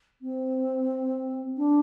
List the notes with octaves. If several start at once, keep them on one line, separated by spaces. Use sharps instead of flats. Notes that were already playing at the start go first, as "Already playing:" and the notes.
C4
D4